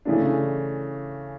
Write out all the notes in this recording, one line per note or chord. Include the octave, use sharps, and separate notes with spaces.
C#3 E3 A3 D4